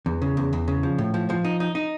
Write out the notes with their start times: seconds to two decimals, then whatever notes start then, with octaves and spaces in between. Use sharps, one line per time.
0.06 E2
0.22 C#3
0.37 E2
0.53 E2
0.68 C#3
0.83 F3
0.98 A2
1.14 F3
1.30 F3
1.45 D#4
1.60 D#4
1.75 D#4